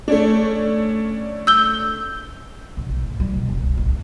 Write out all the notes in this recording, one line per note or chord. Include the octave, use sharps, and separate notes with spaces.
A3 C#4 D4
E6 G6 G7
E1
B1
G#2
G3
B2
E1
C2
A1
D4